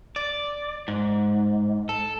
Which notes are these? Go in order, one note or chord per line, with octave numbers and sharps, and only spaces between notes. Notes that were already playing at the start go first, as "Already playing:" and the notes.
D5
G#2
A4